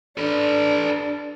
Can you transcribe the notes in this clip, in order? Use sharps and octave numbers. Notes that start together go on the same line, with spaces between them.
D4 A4 B4